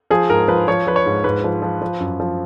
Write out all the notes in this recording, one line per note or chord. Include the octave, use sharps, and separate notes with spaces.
F3 G#4
G#2 A#4
F3 B4
F3 C#5
F3 B4
C#5
G#2
G#2 B4
F3
F3
F3
F#2
F3